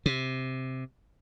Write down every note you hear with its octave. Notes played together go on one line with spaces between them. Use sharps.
C3